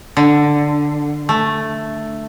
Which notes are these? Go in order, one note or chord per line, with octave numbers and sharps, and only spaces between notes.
D3
A3